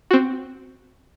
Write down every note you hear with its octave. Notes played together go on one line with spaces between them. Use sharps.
C4 F#4